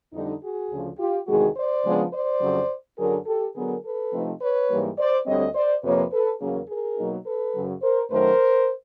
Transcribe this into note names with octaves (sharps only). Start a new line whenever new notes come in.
F2 D3 G3 D#4
F#4 G#4
D2 C#3 F3
F4 G4
E2 C3 D#3 G#3 F#4 G#4
C5 D5
C#3 F3 G#3 B3 D4
C5 D5
F2 C#3 F#3
F#2 D3 F#3 G#4 A#4
G4 A4
D3 F#3 B3 G#4 A#4
A4 B4
C3 F3 A3 C4 D#4
B4 C#5
G#2 E3 G3 A#3
C5 D5
D2 D3 G3 C4 C#5 D#5
C5 D5
F2 C3 F3 A#3 B4 C#5
A4 B4
E2 C#3 F#3 A#3 C#4 G#4 A#4
G#4 A#4
B2 F#3 A#3 D#4
A4 B4
F#2 C#3 F#3
A#4 C5
F#2 D#3 F#3 A3 A#4 C5